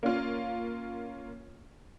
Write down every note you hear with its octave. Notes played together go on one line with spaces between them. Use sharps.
A#3 C#4 F4